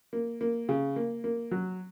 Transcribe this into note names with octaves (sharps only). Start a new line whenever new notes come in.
A#3
A#3
C#3
A#3
A#3
F#3